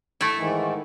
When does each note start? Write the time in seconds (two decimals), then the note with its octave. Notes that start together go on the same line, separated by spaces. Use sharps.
0.21 A3 E4
0.37 G#2 D#3 E3